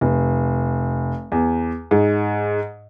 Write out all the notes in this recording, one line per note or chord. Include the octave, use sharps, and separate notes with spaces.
F1
E2
G#2